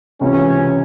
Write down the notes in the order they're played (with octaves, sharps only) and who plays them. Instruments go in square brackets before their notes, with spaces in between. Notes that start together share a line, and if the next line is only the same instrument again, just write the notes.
[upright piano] C#2 C3 E3 [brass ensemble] C#4